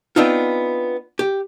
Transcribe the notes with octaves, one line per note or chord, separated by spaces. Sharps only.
B3 C4 D4 D#4 F4
G4